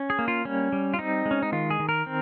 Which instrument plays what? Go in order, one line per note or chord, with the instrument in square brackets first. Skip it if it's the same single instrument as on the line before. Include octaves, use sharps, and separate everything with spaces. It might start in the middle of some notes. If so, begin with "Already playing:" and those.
Already playing: [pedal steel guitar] C#4
G#4
A#3
F4
G3 C#4
G3
F4
C4 D#4
G#3
C#4
D#4
D#3 F4
G#4
D#3
A#4
C4